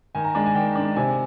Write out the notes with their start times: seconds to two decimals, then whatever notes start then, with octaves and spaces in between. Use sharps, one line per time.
0.15 D#3 G#5
0.24 A#5
0.35 G#3 D4 G#5
0.46 G#5
0.55 D#3 G5
0.75 G#3 D4
0.96 C3 G#5